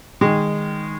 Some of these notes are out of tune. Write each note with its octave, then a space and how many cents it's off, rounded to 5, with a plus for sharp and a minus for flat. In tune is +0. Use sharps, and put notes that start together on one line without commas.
D#3 +0 G#3 -15